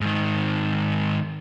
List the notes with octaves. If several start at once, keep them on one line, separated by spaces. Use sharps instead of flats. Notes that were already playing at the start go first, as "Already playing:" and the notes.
G#2 D#3